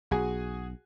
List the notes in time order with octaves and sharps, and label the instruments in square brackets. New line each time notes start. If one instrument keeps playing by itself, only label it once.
[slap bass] B1 [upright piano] F#4 G#4 G#5